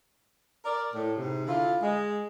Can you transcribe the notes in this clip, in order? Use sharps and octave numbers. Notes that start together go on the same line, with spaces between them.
A#4 D5
A2
G#2 C3
D3 E4 F4
G#3